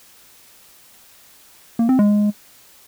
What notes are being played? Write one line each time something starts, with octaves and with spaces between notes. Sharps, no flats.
A#3
C4
G#3